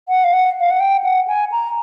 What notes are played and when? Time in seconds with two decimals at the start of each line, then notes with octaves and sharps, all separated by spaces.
0.09 F#5
0.24 F5
0.33 F#5
0.60 F5
0.70 F#5
0.80 G5
1.04 F#5
1.28 G#5
1.52 A#5